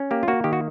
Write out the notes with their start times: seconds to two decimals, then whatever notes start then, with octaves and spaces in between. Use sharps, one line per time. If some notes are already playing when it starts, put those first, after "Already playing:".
Already playing: C#4
0.11 A#3 G4
0.23 F4
0.28 A#3 F#4
0.44 D#3 G4
0.53 F#4